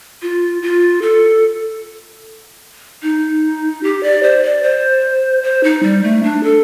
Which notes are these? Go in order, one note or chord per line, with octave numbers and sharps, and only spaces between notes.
F4
F4
A4
D#4
G4
D5
C5
D5
C5
C5
D#4
G3
A3
D4
A4